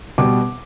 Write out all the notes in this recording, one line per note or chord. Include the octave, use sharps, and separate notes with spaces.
B2 G3 D6